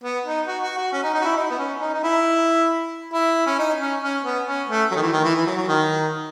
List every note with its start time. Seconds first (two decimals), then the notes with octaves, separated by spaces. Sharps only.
0.04 B3
0.26 D#4
0.47 F#4
0.63 F#4
0.78 F#4
0.93 C#4
1.04 D#4
1.14 D#4
1.22 F#4
1.25 E4
1.37 D#4
1.51 B3
1.58 C#4
1.81 D#4
1.94 D#4
2.03 E4
3.13 E4
3.46 C#4
3.59 D#4
3.81 C#4
4.03 C#4
4.24 B3
4.47 C#4
4.69 A3
4.92 F#3
4.96 D#3
5.02 E3
5.13 D#3
5.24 E3
5.36 E3
5.46 F#3
5.57 F#3
5.68 D#3